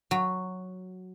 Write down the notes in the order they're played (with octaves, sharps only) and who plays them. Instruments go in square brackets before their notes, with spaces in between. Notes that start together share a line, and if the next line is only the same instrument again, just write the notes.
[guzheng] F#3